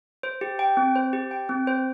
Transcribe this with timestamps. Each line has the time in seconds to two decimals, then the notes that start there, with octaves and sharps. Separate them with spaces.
0.23 C5
0.41 G4
0.59 G5
0.77 C4
0.96 C5
1.13 G4
1.31 G5
1.49 C4
1.67 C5